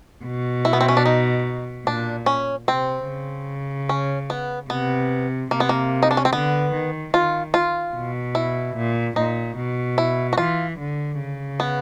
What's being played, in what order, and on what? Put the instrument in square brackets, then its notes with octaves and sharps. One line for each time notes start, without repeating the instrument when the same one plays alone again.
[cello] B2
[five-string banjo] E4
B3
C4
C#4
D4
D#4
[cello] A#2 [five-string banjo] D4
[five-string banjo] C#4
[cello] C3 [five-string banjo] C4
[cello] C#3
[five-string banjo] C#4
B3
[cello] C3 [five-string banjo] B3
[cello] C3 [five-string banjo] A#3
[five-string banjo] B3
A#3
D#4
D4
C#4
C4
[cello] D3 [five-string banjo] B3
[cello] D#3
[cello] D#3 [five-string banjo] F4
[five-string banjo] F4
[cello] B2
[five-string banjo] E4
[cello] A#2
[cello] A#2 [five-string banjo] D#4
[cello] B2
[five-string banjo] E4
F#4
[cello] E3 [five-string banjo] F4
[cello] D3
C#3
[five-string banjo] B3